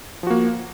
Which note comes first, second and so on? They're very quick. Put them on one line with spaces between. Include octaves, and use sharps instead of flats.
F3 F#4 A#3